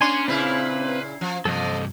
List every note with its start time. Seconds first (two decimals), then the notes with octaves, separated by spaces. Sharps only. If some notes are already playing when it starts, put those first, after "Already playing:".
0.01 A#3 C#4 D4 G#5 C6
0.28 A#2 C#3 C4 E4 B4 F5
1.21 F3
1.45 G2 C3 F3 A4 D#5